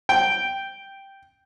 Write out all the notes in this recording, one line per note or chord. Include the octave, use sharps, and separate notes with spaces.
G5